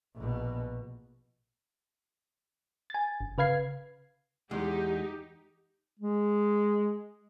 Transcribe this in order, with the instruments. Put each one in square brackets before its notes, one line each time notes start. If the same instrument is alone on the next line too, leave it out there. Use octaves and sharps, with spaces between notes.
[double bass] A#1 B2
[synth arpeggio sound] G#5 A6
G1
C#3 B4 F5 G#6 C7
[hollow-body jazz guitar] E2 G#3 [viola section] D#4 G4
[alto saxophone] G#3